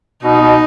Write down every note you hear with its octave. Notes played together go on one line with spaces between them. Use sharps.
B2 D#4
B2